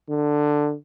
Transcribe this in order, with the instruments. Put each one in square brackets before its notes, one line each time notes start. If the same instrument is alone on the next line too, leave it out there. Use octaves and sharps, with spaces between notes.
[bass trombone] D3